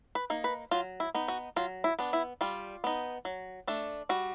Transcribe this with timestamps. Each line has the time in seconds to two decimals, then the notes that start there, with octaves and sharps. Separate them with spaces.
0.15 B4
0.30 A#3 D#4
0.44 B4
0.71 F#3 F4
1.00 E4
1.14 B3 D#4
1.28 F#4
1.56 F#3 F4
1.84 E4
1.99 B3 D4
2.13 E4
2.41 G3 F4
2.84 B3 D#4
3.25 F#3
3.67 A3 D4
4.09 G3 F#4